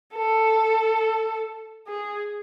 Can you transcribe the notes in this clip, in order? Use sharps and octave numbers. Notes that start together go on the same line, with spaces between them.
A4
G#4